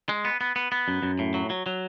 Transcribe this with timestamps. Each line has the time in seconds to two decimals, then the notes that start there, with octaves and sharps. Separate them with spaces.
0.09 G#3
0.25 B3
0.41 B3
0.56 B3
0.72 B3
0.88 F#2
1.02 F#2
1.19 A2
1.34 F#3
1.50 F#3
1.66 F#3